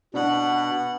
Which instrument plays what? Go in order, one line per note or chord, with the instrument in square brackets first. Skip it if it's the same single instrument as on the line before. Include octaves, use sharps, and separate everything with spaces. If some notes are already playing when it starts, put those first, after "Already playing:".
[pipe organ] B2 [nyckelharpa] B3 F#5 [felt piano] D4